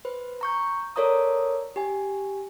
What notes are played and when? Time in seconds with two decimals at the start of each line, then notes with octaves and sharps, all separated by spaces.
0.05 B4 C5
0.41 A#5 C#6 G6
0.96 A4 A#4 C#5 D5 A#5 D#6
1.76 G4 G#5